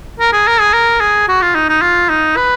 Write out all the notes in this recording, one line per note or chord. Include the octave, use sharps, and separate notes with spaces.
A#4
G#4
A#4
G#4
A#4
G#4
F#4
F4
D#4
D#4
F4
D#4
B4